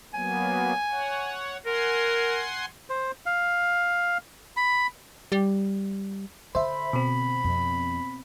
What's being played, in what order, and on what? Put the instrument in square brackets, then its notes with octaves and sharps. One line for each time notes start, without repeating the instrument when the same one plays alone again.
[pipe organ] F#3 A#3 B3 [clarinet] G#5
[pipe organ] C#5 F#5
[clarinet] A#4 [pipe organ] F#5 G#5 C6
[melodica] C5
F5
B5
[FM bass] G3
[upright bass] D3 [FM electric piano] C5 E5 [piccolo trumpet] B5
[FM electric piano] B2 C4
[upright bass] F2